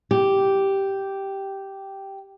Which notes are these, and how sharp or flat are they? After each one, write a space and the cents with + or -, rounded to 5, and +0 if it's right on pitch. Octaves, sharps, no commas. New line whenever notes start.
G4 -5